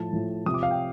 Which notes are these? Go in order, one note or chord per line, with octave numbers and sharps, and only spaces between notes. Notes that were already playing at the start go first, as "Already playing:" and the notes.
Already playing: A2 F3 A5
A2 F3
C3 F3 D#6
D6
F5
G5